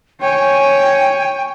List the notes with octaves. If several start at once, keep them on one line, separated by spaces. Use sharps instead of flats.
C#5 G5 G#5